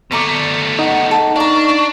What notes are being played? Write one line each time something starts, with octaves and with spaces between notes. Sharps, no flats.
B2 A3 D5 A#5 C#6
D#4 F#5
A4
D4 F5 A#5 C#6